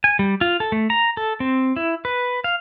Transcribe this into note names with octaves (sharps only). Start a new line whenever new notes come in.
G#5
G3
F4
A4
A3
A#5
A4
C4
E4
B4
F5